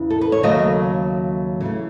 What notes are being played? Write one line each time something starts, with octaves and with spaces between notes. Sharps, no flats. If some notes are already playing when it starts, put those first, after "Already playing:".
Already playing: E2 C#3 E3
A4
B4
C#5
D#2 C#3 F#3 A3 D#5
C#3 E3 A3